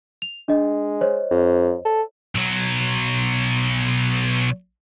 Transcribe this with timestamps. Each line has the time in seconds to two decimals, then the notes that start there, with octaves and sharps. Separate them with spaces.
0.22 F7
0.48 G#3 D4 D#5
1.01 C5 C#5 D#5
1.31 F2
1.85 A4
2.35 B1 F#3